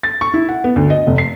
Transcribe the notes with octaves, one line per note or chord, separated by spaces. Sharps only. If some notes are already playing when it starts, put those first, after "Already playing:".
A6
C#6
E4
F#5
B3
D2
D#5
F1
C7